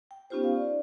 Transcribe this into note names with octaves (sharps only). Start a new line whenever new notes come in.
G5
B3 C#4 D#4 F4 G4 C5
F5
D5